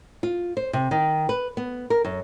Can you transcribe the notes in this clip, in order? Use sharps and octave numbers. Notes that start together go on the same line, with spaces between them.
F4
C5
C3
D#3
B4
B3
A#4
F#2